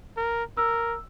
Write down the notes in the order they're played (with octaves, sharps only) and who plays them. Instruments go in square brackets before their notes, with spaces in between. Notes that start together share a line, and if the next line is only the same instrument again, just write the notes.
[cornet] A#4
[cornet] A#4 [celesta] E6